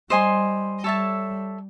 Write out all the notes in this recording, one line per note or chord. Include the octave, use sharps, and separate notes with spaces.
G3 C5 D#5 G#5 C6
G3 A4 C#5 E5 A5